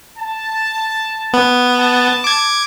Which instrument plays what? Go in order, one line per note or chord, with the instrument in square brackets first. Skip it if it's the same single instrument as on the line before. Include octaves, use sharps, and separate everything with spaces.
[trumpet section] A5
[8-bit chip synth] B3
[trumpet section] A5
[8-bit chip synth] D6 G#6